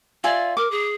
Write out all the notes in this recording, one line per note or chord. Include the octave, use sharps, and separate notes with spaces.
F4 D5 E5 G#5
A#4 D6
G#4